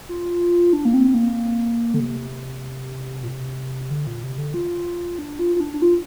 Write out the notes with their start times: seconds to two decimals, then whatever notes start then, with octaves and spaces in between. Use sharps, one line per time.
0.09 F4
0.73 D4
0.85 A#3
0.94 C4
1.14 A#3
1.94 D3
2.00 C3
3.23 A#2
3.28 C3
3.90 D3
4.07 A#2
4.23 C3
4.38 D3
4.54 F4
5.18 D4
5.39 F4
5.55 F4
5.60 D4
5.74 D4
5.82 F4